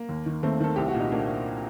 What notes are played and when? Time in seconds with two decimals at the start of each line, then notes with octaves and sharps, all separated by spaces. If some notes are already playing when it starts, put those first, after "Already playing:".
Already playing: A#3
0.09 D#2
0.26 D#3
0.43 D#2 A3 C4
0.60 D#3 A4
0.76 C2 G4
0.88 F#4
0.95 A#2
1.00 D#4
1.12 A#3 D4